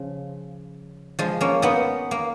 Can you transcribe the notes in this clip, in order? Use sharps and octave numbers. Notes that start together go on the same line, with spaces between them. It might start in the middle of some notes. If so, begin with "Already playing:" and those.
Already playing: C#3 F3
F3 G#3
A#3 C#4
B3 D#4
A#3